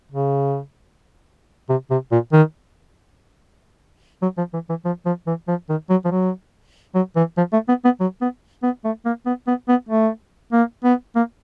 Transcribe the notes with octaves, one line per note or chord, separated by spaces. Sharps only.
C#3
C3
C3
A#2
D#3
F#3
F3
E3
E3
F3
F3
E3
F3
D#3
F#3
F3
F#3
F#3
E3
F3
A3
B3
B3
F#3
B3
B3
A3
A#3
B3
B3
B3
A3
A#3
B3
A#3